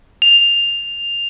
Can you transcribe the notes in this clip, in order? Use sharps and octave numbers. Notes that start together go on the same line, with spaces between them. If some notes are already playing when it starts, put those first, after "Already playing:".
F7